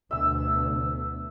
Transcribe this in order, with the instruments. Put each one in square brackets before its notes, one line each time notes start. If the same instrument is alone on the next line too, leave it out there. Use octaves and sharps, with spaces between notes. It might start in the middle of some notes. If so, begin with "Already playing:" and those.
[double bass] D2 B2 [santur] E5 E6